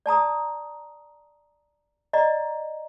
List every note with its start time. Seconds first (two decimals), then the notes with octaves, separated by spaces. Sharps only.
0.06 D5 A5 A#5 D#6
2.13 D5 D#5 A#5